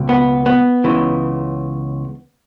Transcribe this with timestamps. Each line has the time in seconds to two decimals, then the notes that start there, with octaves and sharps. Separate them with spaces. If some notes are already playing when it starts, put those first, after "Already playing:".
Already playing: C#2 B2
0.09 B3
0.46 B3
0.84 C#2 C#3 E3